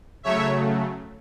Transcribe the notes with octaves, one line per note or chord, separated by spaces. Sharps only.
C#3 F#3 A3 C#5 E5